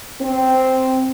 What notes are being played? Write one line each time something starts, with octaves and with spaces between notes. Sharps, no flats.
C4